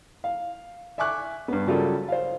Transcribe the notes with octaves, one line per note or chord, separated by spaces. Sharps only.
F5
E5 G#5 C#6 D6 F#6
G2 B3
C#3 F#3 G3 F4 A4 A#4
C5 F5